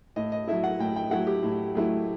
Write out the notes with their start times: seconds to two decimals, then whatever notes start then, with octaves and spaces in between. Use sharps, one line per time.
0.16 A2 D#5
0.32 D#5
0.47 F#3 A3 E4 E5
0.64 F#5
0.79 A2 G5
0.96 G5
1.11 F#3 A3 E4 F#5
1.27 G4
1.43 A2
1.75 F#3 A3 E4